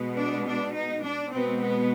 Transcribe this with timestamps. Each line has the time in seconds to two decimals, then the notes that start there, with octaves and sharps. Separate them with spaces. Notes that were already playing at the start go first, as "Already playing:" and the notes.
Already playing: B2 G#3 B3
0.18 D4
0.46 D4
0.75 D#4
1.03 D4
1.32 B2 G#3 B3 C4
1.60 B3